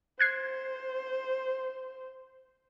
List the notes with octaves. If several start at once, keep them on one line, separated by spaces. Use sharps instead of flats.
C5 F#6 G#6 C7